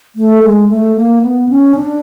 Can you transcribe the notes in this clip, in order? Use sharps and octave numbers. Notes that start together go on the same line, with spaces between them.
A3
G#3
A3
A#3
B3
C#4
D4